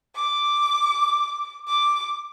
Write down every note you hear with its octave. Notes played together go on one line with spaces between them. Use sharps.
D6
D6